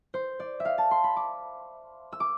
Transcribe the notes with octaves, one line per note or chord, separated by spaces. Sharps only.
C5
D5
E5
F5
A5
C6
B5
D6
E6
D6